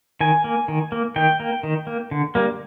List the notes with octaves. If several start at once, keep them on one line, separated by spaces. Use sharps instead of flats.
D#3 G#5
A#3
D#3
A#3
D#3 G5
A#3
D#3
A#3
D3
G3 A#3